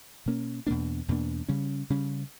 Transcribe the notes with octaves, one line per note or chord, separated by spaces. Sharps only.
B2 A#3 C#4
E2 B2 A#3 D4
E2 B2 A#3 D4
C#3 G3 C#4
C#3 G3 C#4